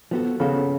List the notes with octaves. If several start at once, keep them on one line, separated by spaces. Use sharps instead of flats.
F3 B3 F#4 A4
C#3 F3 B3 F#4 A4